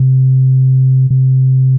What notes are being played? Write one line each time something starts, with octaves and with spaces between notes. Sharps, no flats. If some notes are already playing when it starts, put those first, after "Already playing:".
Already playing: C3
C3